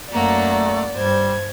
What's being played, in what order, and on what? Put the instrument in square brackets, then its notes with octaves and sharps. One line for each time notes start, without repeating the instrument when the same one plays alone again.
[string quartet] F#2 A#5 [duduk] A3 [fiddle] A#3 F#5 [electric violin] D5
[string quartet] G2 G#6 [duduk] G3 [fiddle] C5